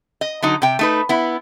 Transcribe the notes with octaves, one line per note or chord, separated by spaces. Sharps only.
D#5
D3 F#3 D#4
C3 G5
A3 D#4 B4
B3 E4